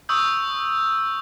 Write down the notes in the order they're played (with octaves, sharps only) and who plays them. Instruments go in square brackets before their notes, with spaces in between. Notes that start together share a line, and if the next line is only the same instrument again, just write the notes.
[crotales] C#6 D#6 E6 G6